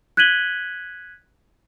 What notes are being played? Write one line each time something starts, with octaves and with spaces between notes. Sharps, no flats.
F#6 G#6 B6 D#7 F#7 G7